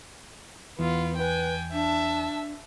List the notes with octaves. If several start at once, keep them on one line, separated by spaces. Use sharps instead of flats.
E2 E3 B3 F4
B4 G5 G#5
D4 E5 A5